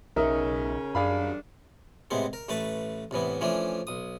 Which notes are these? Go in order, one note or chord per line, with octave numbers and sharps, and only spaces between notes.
B1 C#3 C#4 D#4 A#4 E5
F#2 D#3 G3 D4 G#4 F5 B5
A2 C3 G#3 B3 C4
A#4
A1 A3 B4 A5 B5 C#6
C2 A2 E3 B3
E3 F3 A3 C#4 D4
B1 D#6